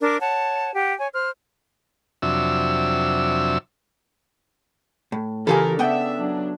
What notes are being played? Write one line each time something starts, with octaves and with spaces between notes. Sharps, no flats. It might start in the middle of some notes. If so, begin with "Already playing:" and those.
D4 A#4 D6
C#5 F#5 A5
G4 F#5
C#5 G#5
C5 F6
F2 C3 F#3 D4 E5 E6
A2
C#3 E3 F4 G4 A4 A#4 G#5
B3 D4 E5 F#5 G5
F#3 D4